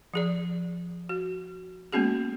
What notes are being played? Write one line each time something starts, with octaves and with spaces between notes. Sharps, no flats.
F3 G#4 D5
F#4
G#3 A#3 B3 C#4 F#4 G#4